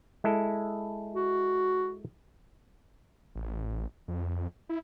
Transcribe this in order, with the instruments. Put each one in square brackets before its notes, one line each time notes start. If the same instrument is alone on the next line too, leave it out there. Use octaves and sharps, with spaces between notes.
[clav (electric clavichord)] G#3 E4 A4
[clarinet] F#4
[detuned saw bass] A1
F2
E4